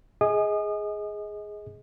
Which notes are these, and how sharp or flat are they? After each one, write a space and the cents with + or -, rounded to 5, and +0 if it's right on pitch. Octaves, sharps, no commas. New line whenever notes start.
G#4 +0 D#5 +25 D#6 -35